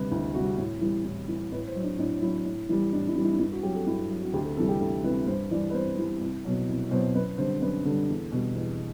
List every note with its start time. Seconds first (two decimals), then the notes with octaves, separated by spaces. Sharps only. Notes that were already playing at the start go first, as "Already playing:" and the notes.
Already playing: D2 C3 G3 B4
0.11 D2 E4
0.34 C3 G3 F#4
0.58 A2
0.81 E3 G3
1.05 A2
1.28 E3 G3
1.52 A2 B4
1.67 C5
1.75 F#3
1.83 D4
1.99 A2 D4
2.22 F#3 E4
2.46 A2
2.69 E3 G3
2.93 A2 D4
3.08 E4
3.16 E3 G3
3.24 E4
3.33 D4
3.39 G2 E4
3.52 F#4
3.63 F#3 G4
3.75 A4
3.86 G2 E4
4.09 F#3
4.22 F#4
4.33 D2 G4
4.45 A4
4.57 C3 E3 G3 A4
4.69 G4
4.80 D2 A4
5.04 C3 E3 G3 B4
5.27 G2 C5
5.51 E3 G3 D5
5.70 B4
5.74 G2 C5
5.98 E3 G3
6.21 C2
6.45 B2 F#3
6.68 C2
6.91 B2 F#3 C5
7.15 F#2 B4
7.38 D3 G3 C5
7.62 F#2 B4
7.85 D3 G3 A4
8.09 E2
8.32 B2 G3
8.55 E2